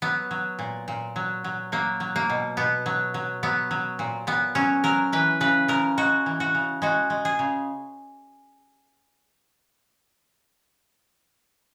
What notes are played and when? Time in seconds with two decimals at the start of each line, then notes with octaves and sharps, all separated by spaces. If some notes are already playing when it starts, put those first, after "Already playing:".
0.02 F#3 B3
0.31 F#3
0.59 A#2
0.88 A#2
1.16 F#3
1.44 F#3
1.72 F#3 A#3
2.00 F#3
2.16 A#3
2.30 B2
2.57 B2 B3
2.86 F#3
3.14 F#3
3.43 F#3 B3
3.71 F#3
3.99 A#2
4.27 A#2 B3
4.55 F#3 C#4
4.84 F#3 A#4
5.13 E3 B4
5.41 C#3 B4
5.68 C#3 A#4
5.97 G#3 F#4
6.26 E3
6.40 F#4
6.55 C#3
6.82 G#3 F#4
7.10 G#3
7.25 G#4
7.39 C#3